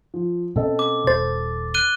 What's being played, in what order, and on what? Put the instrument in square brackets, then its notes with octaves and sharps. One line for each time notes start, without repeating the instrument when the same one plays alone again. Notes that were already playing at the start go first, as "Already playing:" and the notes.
[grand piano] F3
[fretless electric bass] B2 A#3 C#4 [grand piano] C4 A4 D#5
[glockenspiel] D6
[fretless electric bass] D#1 [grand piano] A4 [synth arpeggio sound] C5 [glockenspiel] A6
[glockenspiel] F#6 D#7 G7